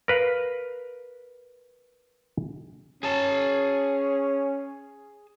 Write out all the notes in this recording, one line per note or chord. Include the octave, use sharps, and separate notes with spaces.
A#4 B4 F5
C#4 G#4 A5